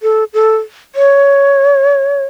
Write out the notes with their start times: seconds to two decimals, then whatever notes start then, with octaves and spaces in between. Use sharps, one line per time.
0.03 A4
0.34 A4
0.95 C#5